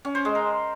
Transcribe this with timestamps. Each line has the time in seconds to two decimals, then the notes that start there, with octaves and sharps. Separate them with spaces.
0.05 C#4
0.15 C5
0.25 G#3
0.35 A#4